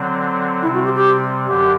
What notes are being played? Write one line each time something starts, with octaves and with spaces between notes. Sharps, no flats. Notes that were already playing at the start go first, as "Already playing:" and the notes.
Already playing: D3 F#3 C4
C3 G3 C4 E4
F#4
G4
G4
F#2 D3 F#3 G4